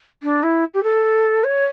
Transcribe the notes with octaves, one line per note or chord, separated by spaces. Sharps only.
D4
E4
G4
A4
C#5